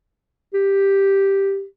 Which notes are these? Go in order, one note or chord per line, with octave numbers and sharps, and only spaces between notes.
G4